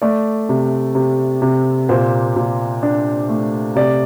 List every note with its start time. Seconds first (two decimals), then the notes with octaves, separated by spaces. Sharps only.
0.02 A3 D5
0.49 C3
0.95 C3
1.42 C3
1.89 A#2 C5
2.36 A#2
2.83 D4
3.29 A3
3.75 C3 D5